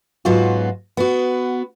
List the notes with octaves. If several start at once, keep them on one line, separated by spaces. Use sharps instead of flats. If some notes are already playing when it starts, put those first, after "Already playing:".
G#2 F#3 B3 F4 F#4
B3 F#4